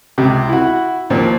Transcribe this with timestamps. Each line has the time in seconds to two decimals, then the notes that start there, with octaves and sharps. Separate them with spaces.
0.18 C#2 C3
0.49 E4 F#4
1.10 D#2 A#2 F3 C4